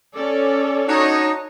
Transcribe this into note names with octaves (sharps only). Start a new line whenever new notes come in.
C#4 A4 D5
D4 D#4 F#4 C#5